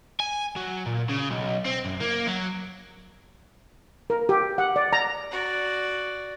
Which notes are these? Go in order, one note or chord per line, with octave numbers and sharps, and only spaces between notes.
G#5
F#3
A#2
C#3
B1
C4
F#2
A#3
F#3
A#4
G4
F#5
D5
A#5
F#4 D5